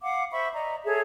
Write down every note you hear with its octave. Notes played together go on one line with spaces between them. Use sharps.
F5 F#5 D6
C5 E5 B5 C#6
D5 D#5 A#5
G#4 A4 C#5 E5